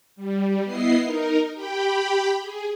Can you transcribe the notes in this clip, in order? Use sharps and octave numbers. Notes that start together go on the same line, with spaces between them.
G3
B3 E4 D#5 C7
D#4 A#4
G4 G5 B5
G#4